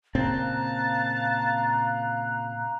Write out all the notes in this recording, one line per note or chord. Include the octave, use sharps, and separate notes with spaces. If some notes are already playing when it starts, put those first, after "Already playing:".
A#2 C#3 C4 F5 A5 A#5 F#6